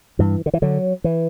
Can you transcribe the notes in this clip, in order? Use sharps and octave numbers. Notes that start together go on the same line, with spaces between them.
G2 E3
D3
E3
D3 F#3
E3